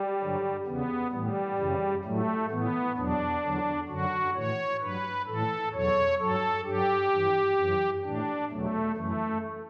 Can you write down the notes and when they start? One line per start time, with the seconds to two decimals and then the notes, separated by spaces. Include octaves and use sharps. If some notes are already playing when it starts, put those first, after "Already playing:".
Already playing: G3
0.20 G2 D3 F#3
0.66 E2 C#3 E3 B3
1.12 A2 E3 G3
1.58 F#2 C#3 E3
2.04 A2 F#3 A3
2.50 A2 E3 B3
2.97 E2 B2 F#3 D4
3.43 E2 D3 F#3
3.88 F#2 D3 F#3 F#4
4.35 A2 E3 C#5
4.81 G2 F#3 B4
5.27 A2 E3 A4
5.73 E2 B2 F#3 C#5
6.19 G2 F#3 A4
6.65 G2 F#3 G4
7.12 G2 E3
7.58 F#2 E3
8.04 A2 E3 D4
8.50 E2 B2 F#3 A3
8.96 F#2 E3 A3